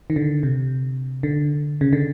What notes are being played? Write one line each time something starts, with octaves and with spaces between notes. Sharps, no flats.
D#3
D3
C3
D3
C#3
D3